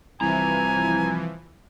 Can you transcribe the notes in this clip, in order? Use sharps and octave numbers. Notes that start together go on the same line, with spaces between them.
C2 E3 F3 G#5 A#5